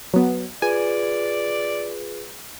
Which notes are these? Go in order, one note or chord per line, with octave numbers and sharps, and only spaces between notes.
F#3 B3
F4 G#4 B4 D5 G#5